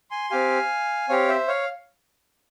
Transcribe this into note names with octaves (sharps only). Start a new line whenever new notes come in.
G#5 C6
C4 G4 F5 G#5
C4 G4 C#5 F5
C5 E5
C#5 F5